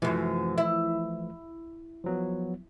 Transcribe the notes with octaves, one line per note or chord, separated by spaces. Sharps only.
F#2 C3 E3 F3 A3
E4
F3 F#3 B3